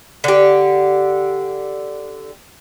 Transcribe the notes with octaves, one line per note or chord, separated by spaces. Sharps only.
D3 G4